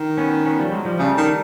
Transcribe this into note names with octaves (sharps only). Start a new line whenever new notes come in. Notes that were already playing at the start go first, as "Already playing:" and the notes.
Already playing: D#3
B3 C#4
B3 C#4
F3 G3
F#3 G#3
F3 G3
C#3 G3 A3
D#3